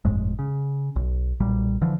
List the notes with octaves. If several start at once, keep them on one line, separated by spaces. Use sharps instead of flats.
G1 F2 A2 G#3
C#3
B1
B1 A#2 G3
D3 E3 F3